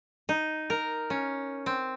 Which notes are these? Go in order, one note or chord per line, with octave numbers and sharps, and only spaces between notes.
D#4
A#4
C#4
C4